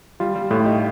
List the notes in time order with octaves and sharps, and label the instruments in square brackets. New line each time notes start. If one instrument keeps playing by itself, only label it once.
[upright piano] G3 [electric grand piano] F4
[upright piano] G3
[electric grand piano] A2 [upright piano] A3
[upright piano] D#4 G4